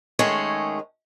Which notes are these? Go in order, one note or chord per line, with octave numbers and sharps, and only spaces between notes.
D#3 G#3 A3 C#4 G#4